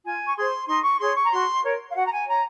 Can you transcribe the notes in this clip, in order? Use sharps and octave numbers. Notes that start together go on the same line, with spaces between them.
F4 G#5
C#6
G#4 C5 C6
D#4 C6
C#6
G#4 C#5 C6
C#6
A#5
F#4 C6
A#4 C#5
F5
F#4 F#5
A#5
G#5
C#5 A#5